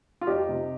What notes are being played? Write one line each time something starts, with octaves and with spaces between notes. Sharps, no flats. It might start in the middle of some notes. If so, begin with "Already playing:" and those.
F4
F2 D#4 G4
C3